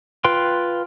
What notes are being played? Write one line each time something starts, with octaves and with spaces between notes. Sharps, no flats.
F4 B4 G5 C6